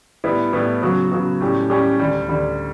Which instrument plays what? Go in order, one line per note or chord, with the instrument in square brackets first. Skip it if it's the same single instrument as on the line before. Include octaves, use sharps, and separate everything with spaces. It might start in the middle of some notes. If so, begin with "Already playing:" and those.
[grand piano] A2 G3 B3 E4
A2 G3 B3 E4
C#3 F#3 B3 F#4
C#3 F#3 B3 F#4
A2 G3 C#4 G4
A2 G3 C#4 G4
D2 D3 G3
D2 D3 G3